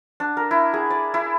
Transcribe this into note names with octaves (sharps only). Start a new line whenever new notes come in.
D4
A#4
E4
G#4
D5
E4